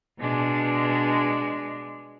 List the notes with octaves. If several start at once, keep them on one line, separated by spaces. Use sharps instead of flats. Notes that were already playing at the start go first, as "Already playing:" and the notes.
B2 G#3 D4